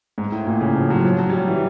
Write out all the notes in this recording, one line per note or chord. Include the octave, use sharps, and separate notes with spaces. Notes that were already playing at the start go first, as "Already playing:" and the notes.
G#2
A2
A#2
C#3
F3
F#3
F3
F#3
G3
F#3
E3